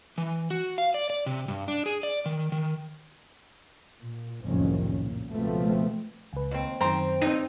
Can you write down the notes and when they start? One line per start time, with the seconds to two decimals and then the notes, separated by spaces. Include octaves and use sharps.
0.18 E3
0.50 F#4
0.78 F5
0.94 D5
1.10 D5
1.26 C3
1.48 G2
1.68 D4
1.86 G#4
2.03 D5
2.26 D#3
2.52 D#3
3.99 A#2
4.41 F#1 C2 F2 A2 D#3 C#4
5.03 A#2
5.32 C#2 B2 F3 A3 B3 C4
6.33 C#2 B4
6.51 D#2 C4
6.81 F#2 D#3 C4 G5 A#5 C6
7.21 G2 C4 D#4